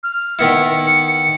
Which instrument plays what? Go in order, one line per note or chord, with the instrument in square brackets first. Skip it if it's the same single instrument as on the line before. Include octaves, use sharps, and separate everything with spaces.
[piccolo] F6
[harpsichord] D#3 B3 E4 [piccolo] C#7